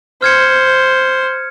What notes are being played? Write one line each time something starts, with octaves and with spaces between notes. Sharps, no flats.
C5 F6 G#6 C#7